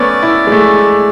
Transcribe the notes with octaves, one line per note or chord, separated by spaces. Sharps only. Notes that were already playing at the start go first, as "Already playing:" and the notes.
Already playing: A3 B3 C#4 D5
E4
G#3
A3